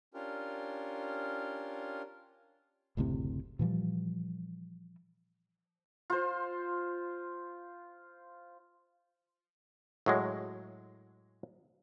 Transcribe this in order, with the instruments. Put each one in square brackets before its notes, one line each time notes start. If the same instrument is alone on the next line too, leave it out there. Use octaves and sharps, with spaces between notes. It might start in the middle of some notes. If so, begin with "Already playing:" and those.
[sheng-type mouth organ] C#4 D4 F4 G4 A#4
[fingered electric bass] F#1 D2 A2 C3
A#2 E3 F3 G3
[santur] F4 C5
[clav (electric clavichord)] A2 F#3 G#3